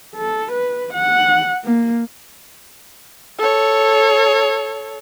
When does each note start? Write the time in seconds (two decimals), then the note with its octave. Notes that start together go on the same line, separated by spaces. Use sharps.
0.15 A4
0.52 B4
0.93 F#5
1.65 A#3
3.39 A4 C#5